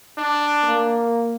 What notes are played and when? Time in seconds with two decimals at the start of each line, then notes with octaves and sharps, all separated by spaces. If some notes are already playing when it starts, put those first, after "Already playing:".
0.18 D4
0.63 A#3